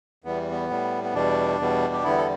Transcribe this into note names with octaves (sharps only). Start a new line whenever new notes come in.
E2 E3 G3 B3
B3
A2 G3
B3
E2 B2 G3 D4
E2 B2 G3
G4
E2 D3 G3 B3 E4
A4